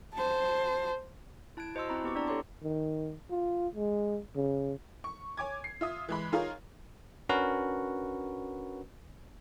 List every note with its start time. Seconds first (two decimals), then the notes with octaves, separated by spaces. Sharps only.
0.14 C5 A5
1.57 E4 A5 F#6 G#6 D7
1.75 F#4 C5 D#5 A5 C6 E6
1.88 C4 E4 A#5 B5
2.04 B3 G4 C#6 D6
2.15 D4 E4 D5 A5 A#5
2.27 G4 A4 C#5 A#5 C6 D6
2.63 D#3
3.30 F4
3.75 G#3
4.36 C#3
5.04 C#6
5.37 C#5 G#5 D6 G#6
5.64 C7
5.81 F4 E5 D#6
6.09 E3 G#3 B5
6.32 D#4 F4 G#4 A#4 C#5 F5
7.29 C#4 D4 F#4 A#4 B4